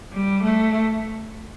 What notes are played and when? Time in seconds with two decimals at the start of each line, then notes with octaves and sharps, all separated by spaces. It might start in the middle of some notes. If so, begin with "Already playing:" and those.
0.13 G3
0.44 A3